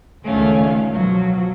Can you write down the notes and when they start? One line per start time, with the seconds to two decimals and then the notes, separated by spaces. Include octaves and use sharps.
0.24 C#2 D3 D#3 A3 C#4 F5
0.93 B2 F3 F#3